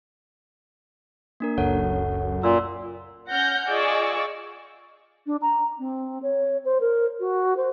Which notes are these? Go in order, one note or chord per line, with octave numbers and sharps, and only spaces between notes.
A#3 D4 A#4
F#1 C#2 F#2 A4 C#5 F#5
A#2 E6
C#4 F#5 F6 G6 A#6
F4 G#4 D5 D#5 C#6 E6
D4
A#5
C4
C#5
C5
A#4
F#4
C5